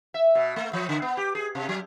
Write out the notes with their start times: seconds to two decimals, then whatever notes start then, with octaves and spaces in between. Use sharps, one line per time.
0.14 E5
0.35 B2
0.56 A3
0.73 F3
0.89 D3
1.02 B3
1.17 G4
1.35 G#4
1.55 C3
1.69 F#3